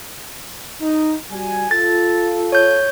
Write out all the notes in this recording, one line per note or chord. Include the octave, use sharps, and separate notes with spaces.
D#4
G3 F#4 G#5
F4 A4 A6
C#5 G6